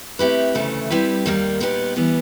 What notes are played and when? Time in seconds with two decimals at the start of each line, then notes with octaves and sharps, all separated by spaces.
0.19 A3 C4 E4 G4 B4
0.55 D2 C#3 E3 A3
0.90 G3 C4 E4 G4 B4
1.26 D#2 D#3 G3 A#3
1.60 A#2 G3 B3 D#4 G4
1.96 E3 G3 B3